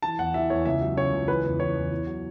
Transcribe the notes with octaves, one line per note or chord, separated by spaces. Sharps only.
E3 A5
E2 F#5
E3 E5
E2 C#5
C#2 E5
F#3
C#3 C#5
C#2
E3 B4
E2
E3 C#5
E2
E2
F#3